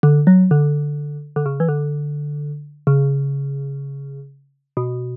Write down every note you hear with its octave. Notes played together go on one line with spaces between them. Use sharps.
D3
F#3
D3
D3
C#3
E3
D3
C#3
B2